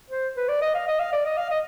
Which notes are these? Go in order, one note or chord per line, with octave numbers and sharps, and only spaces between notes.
C5
B4
D5
D#5
F5
D#5
F5
D5
D#5
F5
D#5